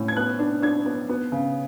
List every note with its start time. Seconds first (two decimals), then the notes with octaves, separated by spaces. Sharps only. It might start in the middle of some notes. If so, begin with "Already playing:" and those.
Already playing: A2 C#4
0.08 G#6
0.17 B3 F#6
0.39 D4
0.62 D4 G#6
0.86 B3
1.09 B3
1.32 C#3